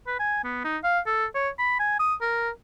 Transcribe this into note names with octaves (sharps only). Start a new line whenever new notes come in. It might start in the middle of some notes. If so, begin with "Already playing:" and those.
B4
G#5
B3
D#4
F5
A4
C#5
B5
G#5
D#6
A#4